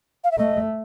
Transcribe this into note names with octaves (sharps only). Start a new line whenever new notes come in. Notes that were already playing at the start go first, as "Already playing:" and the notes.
F5
E5
A3 D#5